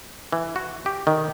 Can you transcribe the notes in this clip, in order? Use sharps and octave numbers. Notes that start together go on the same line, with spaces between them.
E3
F#4
G4
D#3